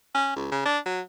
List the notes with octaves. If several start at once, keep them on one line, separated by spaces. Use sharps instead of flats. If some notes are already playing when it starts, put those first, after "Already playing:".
C#4
C#2
C#3
D4
F#3